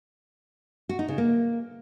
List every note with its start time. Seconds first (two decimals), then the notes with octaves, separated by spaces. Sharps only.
0.89 F#4
0.99 D#4
1.08 C#3
1.18 A#3